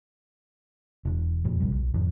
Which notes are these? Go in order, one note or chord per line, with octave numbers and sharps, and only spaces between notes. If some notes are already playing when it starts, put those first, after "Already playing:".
E1
F2 A#2
D1 A#1 C3 G3
B1
G#1 F2